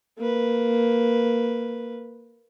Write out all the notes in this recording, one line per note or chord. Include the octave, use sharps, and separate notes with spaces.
A#3 B4